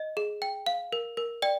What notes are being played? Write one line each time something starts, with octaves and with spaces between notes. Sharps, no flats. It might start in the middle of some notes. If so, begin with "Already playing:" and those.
Already playing: D#5
G#4
G5
F5
A#4
A#4
D5 G5